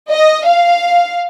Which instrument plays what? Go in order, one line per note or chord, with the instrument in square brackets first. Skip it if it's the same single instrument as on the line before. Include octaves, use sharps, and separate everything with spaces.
[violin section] D#5
F5